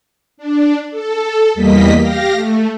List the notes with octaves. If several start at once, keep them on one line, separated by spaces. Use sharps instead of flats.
D4
A4
E2 G3 A#3 D#5 B6
G4 F5 A#6
A3